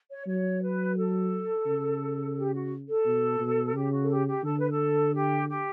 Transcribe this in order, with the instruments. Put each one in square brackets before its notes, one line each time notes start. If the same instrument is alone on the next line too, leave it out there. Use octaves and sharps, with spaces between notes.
[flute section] C#5
[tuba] F#3 [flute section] C#5
[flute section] B4
A4
[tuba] C#3
[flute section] G4
F#4
A4
[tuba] B2
B2
[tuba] C#3 [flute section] G4
[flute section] F#4
A4
G4
G4
[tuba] D3 [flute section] A4
[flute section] B4
A4
G4
G4